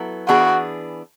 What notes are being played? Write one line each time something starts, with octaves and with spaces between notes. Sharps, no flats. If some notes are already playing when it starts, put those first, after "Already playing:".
Already playing: F#3 B3 E4 A4
E3 B3 D4 F#4 G#4